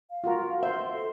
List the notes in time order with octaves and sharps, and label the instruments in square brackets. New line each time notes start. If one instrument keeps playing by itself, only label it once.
[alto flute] F5
[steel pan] F4 F#4 A#4
[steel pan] C5 [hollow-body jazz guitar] E5 [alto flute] C6
[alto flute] A4